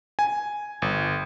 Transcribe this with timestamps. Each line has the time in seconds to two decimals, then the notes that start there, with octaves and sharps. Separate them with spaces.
0.19 G#5
0.82 G1